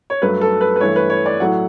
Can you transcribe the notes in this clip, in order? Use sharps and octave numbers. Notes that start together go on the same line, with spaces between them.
C#5
G2 F#3 A3 B4
A4
B4
B4
G2 E3 A3 C#5
B4
C#5
D5
A2 F#3 A3 F#5